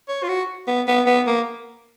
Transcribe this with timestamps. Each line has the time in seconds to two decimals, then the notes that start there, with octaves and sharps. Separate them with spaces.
0.08 C#5
0.23 F4
0.29 F#4
0.67 B3
0.87 B3
1.06 B3
1.27 A#3